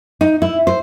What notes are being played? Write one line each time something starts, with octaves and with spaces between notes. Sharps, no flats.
D#4
E4
C5